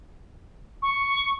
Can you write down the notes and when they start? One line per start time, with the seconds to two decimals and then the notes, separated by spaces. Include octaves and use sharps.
0.82 C#6